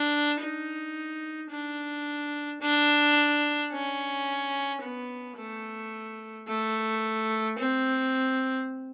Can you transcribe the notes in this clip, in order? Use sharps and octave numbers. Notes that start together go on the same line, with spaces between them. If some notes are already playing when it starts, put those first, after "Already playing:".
Already playing: D4
D#4
D4
D4
C#4
B3
A3
A3
C4